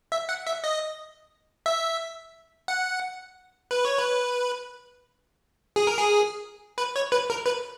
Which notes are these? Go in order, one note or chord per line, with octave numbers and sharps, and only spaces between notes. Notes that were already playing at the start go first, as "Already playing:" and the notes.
E5
F#5
E5
D#5
E5
F#5
B4
C#5
B4
G#4
A#4
G#4
B4
C#5
B4
A#4
B4